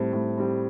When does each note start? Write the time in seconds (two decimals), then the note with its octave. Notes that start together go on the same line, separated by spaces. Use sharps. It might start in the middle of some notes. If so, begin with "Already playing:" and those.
Already playing: A2 G3 C4
0.13 A2
0.38 G3 C4